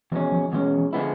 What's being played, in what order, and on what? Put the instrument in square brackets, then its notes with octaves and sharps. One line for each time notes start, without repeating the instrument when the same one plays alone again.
[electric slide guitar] E2 B2 G#3 C#4 [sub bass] E3
[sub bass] F3
[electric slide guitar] E2 B2 G#3 C#4 [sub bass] E3
[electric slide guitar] D3 F3 G#3 B3 E4